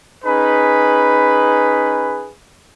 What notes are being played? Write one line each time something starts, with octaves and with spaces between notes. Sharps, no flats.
C#4 D#4 G#4 B4 B5